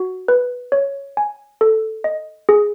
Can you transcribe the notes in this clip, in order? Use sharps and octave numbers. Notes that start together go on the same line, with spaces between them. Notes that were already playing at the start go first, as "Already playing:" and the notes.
Already playing: F#4
B4
C#5
G#5
A4
D#5
G#4